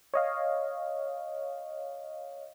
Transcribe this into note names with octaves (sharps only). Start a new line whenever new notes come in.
C#5 D#5 F5